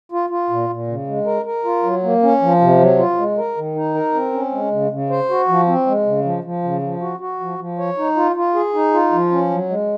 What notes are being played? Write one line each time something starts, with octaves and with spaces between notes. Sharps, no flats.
F4
F4
A#2
A#2
C#3
G#3
A#4
A#4
F4
F#3
A#3
C#4
F3
C3
F#3
F4
G#3
A#4
D#3
D#4
A#4
C4
C#4
G#3
C#3
C#3
C5
F#4
F3
C4
G#3
C#3
F3
F3
C#3
F3
F#4
F#4
F3
F3
C#5
D#4
F4
F4
G#4
D#4
F4
F3
C#4
F#3
G#3